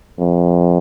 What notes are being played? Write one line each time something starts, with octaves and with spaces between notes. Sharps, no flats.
F2